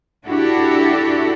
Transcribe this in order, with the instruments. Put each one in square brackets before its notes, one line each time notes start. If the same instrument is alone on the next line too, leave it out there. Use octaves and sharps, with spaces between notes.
[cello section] D4 E4 F#4 G4 A4